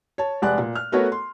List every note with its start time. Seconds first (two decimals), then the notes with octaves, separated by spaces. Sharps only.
0.18 C#5 A5
0.42 F1 G#3 G4 D5 F#5 F#6
0.58 A#2
0.75 F6
0.92 A3 B3 F#4 A#4 C#5 F#5
1.12 C6